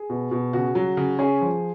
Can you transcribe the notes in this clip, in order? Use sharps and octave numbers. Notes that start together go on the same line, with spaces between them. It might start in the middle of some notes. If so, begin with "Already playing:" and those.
Already playing: G#4
B2
B2
C#3 F#4
F#3
C#3
C#4 G#4
F3